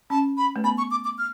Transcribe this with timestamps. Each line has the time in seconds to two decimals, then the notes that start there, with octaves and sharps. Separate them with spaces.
0.10 C#4 A5
0.37 B5
0.56 A3
0.64 B3 B5
0.78 C#6
0.91 D6
1.05 D6
1.18 F6